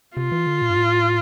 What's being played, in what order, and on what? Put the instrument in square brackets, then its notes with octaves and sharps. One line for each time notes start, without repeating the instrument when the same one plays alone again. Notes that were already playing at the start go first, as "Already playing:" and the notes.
[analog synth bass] C3 [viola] F4
[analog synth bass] E3
D3
A#2
G2
A2